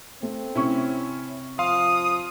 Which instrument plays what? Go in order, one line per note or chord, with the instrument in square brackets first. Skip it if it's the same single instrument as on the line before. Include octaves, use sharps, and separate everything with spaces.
[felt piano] A3 [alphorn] C4
[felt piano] C3 C#6 [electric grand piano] C#4 E4
[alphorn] F3 [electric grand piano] F5 C6 [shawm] D#6